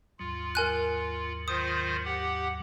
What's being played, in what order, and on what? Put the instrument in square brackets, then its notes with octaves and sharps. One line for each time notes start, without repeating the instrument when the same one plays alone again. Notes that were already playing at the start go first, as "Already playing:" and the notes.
[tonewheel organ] D#2 G#2 F#3 [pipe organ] F4
[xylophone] A#4 G#5 F#6
[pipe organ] D#3 F4 C5 [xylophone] D#6
[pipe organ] G4 F#5